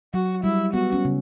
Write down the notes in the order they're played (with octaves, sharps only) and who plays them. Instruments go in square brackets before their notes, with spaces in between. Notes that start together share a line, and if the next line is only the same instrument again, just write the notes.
[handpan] F#3 [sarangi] F#4
[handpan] G3 [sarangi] E4
[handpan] B3 [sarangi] F#4
[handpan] C#4
C#3